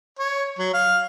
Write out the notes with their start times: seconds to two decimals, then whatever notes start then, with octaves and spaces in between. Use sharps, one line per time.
0.19 C#5
0.59 F#3
0.74 F5